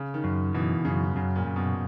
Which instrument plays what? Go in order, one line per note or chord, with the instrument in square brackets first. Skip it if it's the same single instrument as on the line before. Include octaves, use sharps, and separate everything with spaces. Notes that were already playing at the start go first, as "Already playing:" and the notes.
Already playing: [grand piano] C#3
D#3
[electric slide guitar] F#2
[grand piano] B2 [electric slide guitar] E3
[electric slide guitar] F#2 [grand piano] C#3
[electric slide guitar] F#2 [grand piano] C#3
[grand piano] A#2
[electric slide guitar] F#2
[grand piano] B2